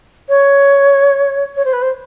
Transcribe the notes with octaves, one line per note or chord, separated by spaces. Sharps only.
C#5
C#5
C5
B4
C5